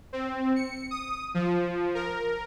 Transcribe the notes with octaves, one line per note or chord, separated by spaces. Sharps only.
C4
C#7
D#6
F3
A#4